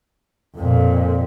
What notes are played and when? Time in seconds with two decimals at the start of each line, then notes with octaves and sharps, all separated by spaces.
0.57 F2 A#2